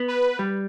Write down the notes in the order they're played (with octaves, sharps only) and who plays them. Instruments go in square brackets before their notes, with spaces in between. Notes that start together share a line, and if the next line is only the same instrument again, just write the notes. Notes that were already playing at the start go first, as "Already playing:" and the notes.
Already playing: [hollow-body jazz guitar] B3
[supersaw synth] B4
[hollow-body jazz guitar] G3